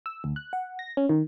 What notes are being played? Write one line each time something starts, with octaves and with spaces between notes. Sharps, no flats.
E6
D2
F#6
F#5
A#6
C#4
D#3